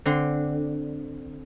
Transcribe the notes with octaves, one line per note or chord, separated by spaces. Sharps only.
D3 C4